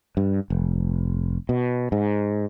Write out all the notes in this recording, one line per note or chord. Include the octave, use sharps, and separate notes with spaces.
G2
F1
B2
G#2